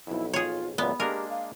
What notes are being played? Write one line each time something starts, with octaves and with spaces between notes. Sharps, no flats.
B1 F2 E4
F4 G#4 C#5
C#2 F#2 A#2 B3 D5
G#3 A#3 D4 G4 A#4
F5